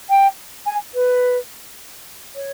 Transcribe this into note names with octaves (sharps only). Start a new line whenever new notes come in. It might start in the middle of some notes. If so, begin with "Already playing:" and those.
G5
G#5
B4
C#5